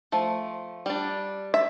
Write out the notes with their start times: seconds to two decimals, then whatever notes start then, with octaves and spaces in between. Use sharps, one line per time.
0.12 F3 A3
0.86 G3 D4
1.54 E5